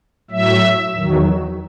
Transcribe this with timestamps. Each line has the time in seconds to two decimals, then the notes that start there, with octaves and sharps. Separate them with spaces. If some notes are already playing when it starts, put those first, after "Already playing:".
0.31 A2 F#3 E5
0.95 E2 D#3 F#3